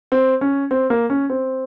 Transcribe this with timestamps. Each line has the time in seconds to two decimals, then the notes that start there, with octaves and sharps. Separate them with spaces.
0.12 C4
0.41 C#4
0.71 C4
0.90 A#3
1.10 C#4
1.30 C4